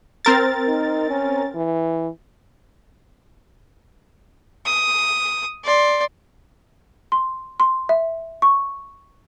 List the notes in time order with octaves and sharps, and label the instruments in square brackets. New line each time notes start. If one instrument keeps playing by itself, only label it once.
[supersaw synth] C4 A#4 A6
[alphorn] D#4
C#4
E3
[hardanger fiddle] D#6
D5 C6
[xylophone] C6
C6
E5
C#6